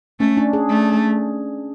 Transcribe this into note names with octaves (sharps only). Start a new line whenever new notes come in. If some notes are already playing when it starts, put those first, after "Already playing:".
A3 C#4
D4
G#4
A3